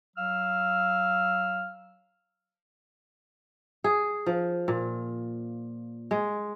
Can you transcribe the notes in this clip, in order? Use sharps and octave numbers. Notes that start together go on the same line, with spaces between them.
F#3 F5 E6 F6
G#4
F3
A#2
G#3